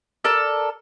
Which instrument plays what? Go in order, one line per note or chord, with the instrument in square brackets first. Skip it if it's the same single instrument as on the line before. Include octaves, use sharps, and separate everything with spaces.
[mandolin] A4 A#4 D5 E6